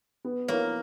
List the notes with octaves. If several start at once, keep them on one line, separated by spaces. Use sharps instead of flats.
B3
A#3 E4 A#4 C#5